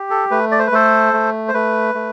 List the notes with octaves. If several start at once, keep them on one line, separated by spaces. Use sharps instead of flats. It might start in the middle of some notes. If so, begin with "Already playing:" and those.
Already playing: G4
A4
A3 B4
D5
C5
B4
A3 A4 C5
A3
C5
A3 B4
A3